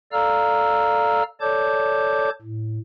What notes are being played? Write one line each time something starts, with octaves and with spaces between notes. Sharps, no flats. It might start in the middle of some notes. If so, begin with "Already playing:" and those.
A4 D5 F5 A#5 E6 F6
A4 C#5 D5 A5 D6 G6
A2